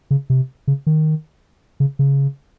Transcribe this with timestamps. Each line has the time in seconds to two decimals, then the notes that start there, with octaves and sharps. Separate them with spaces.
0.11 C#3
0.30 C3
0.67 C#3
0.87 D#3
1.80 C#3
1.99 C#3